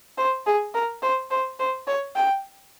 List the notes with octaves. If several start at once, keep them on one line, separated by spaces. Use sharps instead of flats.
C5
G#4
A#4
C5
C5
C5
C#5
G5